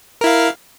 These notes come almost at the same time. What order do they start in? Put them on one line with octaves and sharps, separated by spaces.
A#4 E4 F5